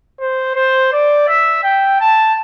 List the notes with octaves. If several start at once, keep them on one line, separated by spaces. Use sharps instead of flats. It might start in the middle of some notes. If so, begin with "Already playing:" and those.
C5
C5
D5
E5
G5
A5